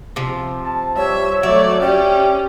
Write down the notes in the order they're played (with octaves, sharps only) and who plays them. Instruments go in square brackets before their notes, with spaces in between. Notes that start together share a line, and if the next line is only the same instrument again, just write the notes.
[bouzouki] C3 F3
[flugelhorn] A5
[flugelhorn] G3 [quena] C#5 [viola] E5
[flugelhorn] F#3 [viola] A3 D5 [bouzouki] E5
[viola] C#4 G4 [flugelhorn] D5 [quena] G5